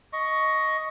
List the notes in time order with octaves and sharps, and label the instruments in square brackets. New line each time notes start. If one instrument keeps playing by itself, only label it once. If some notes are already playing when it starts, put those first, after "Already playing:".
[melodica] D#5 C#6